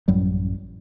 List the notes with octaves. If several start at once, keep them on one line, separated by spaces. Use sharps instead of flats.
A1 F#2 F#3 G3